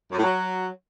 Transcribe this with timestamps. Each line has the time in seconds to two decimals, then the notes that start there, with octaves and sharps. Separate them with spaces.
0.11 F#2
0.16 A2
0.22 F#3